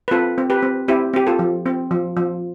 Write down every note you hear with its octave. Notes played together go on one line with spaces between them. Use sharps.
B4
C4 F4 A4
C4
G4 B4
C4
C4 E4 G4
C4 G4
F4 A4
F3
C4
F3
F3